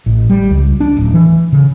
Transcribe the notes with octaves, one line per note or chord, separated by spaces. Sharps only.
A1
G3
C#2
D4
D1
E3
C#3